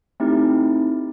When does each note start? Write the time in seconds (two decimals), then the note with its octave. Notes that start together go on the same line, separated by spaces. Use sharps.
0.20 A3 C4 D#4 E4 G4